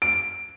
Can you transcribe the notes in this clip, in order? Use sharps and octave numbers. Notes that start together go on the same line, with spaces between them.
D7